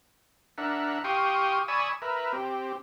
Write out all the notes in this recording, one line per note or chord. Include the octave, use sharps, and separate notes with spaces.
D4 A#4 E5 F#5
G4 F5 G5 C6 C#6 D#6
D5 G#5 B5 C#6 D#6 E6
A#4 B4 E5
C4 G4